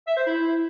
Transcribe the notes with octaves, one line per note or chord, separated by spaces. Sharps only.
E5
C5
E4